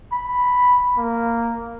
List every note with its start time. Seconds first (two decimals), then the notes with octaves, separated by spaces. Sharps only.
0.12 B5
0.97 A#3